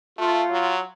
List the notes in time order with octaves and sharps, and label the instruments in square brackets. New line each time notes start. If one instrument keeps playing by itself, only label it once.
[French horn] A3 [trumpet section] F4
[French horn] F#3